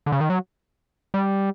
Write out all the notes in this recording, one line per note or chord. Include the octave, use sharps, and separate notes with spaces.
D3
C#3
D#3
F#3
G3